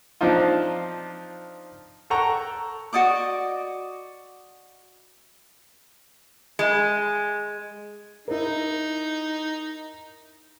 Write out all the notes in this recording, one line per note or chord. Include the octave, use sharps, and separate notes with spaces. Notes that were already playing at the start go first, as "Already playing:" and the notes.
F3 C4 D4 D#4 F4
A4 F#5 G5 A#5 C#6
F#4 D5 D#5 D6
G#3
D#4 E4 A#4